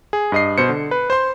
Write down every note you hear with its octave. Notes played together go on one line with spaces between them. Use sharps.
G#4
G2 D#5 C7
B2 C5 C#7
D3
B4
C5 C6